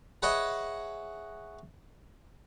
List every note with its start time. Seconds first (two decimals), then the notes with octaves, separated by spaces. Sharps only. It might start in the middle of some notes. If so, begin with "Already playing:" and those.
0.22 G#4 B4 C#5 D#5 E5 F#5